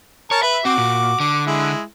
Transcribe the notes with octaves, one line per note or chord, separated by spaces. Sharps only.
A#4 C#5 A5
B4 E5
C4 F#4 D6
A#2
D3 D6
G#3 E4